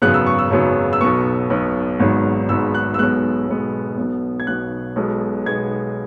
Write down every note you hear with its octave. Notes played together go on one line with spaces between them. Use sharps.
G#1 F#2 C#3 F#3 B3 F#6
E6
C#6
E6
G#1 F#2 C#3 F#3 B3
E6
B1 B2 B3 C#6
B1 B2 B3
G#1 G#2 F#3 B3
G#1 G#2 F#3 B3 E6
F#6
E6
B1 B2 G#3 B3 F#6
B1 B2 G#3 B3
B1 B2 B3
G#6
B1 B2 B3 F#6
B1 B2 G#3 B3
B1 B2 G#3 B3 G#6